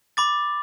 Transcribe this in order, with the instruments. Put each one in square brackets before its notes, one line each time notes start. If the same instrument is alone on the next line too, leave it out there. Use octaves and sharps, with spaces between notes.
[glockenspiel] B5 D6 A6